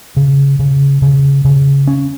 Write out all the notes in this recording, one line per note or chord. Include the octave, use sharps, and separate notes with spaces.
C#3
C#3
C#3
C#3
C#4